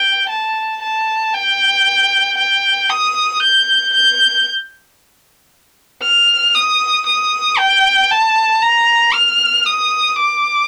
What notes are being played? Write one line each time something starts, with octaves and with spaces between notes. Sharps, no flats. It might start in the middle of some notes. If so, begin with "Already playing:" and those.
Already playing: G5
A5
A5
G5
G5
D#6
G6
G6
F6
D#6
D#6
G5
A5
A#5
F6
D#6
D6